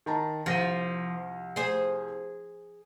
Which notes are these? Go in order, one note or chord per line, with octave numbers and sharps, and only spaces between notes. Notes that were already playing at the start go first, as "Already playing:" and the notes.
D#3 A5 A#5
C2 F3 A#6 D#7
G#4 C5